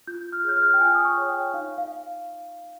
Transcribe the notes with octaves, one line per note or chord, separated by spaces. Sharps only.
F4 G6
F6
G#4 C#5 G6
F6
G5
F4 G#5
D#6
C#6
G#4 C#5
G5
D#4 F5
F5